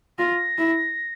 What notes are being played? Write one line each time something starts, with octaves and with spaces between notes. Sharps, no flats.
F4 A#6
E4